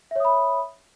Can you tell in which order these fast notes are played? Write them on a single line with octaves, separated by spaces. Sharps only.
E5 C#5 D#6 B5